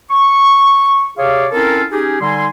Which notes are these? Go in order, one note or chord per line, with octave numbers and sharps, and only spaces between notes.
C#6
C3 G#4 C#5 D5 F5
C4 C#4 E4 F4 A4 A#4
C#4 D#4 G4 G#4
D3 G3 D#4 G#5 C6